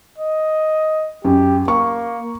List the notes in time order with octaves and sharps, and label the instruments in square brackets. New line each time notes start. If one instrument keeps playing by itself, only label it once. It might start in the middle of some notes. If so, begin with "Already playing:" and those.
[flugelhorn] D#5
[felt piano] F#2 [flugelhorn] G4
[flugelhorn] A#3 [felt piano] C#6